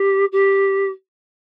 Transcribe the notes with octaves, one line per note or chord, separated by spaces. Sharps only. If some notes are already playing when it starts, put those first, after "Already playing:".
Already playing: G4
G4